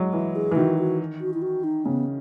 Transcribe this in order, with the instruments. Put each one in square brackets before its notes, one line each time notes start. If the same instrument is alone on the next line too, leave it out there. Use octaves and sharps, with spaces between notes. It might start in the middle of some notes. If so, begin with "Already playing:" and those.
Already playing: [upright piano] F#3 G#3
[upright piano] E3 [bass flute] E4
[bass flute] G#4
[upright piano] E3
[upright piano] D#3 [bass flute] F#4
[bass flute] F#4
F#4
E4
F#4
D#4
[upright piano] C#3 [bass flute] B3